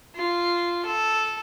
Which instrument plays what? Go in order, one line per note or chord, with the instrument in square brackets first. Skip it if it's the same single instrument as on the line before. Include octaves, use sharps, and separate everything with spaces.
[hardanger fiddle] F4
A4